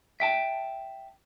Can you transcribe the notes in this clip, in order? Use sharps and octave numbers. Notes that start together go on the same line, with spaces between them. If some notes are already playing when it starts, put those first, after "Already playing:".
E5 G5 A5